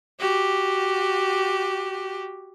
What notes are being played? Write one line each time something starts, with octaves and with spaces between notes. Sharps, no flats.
F#4 G4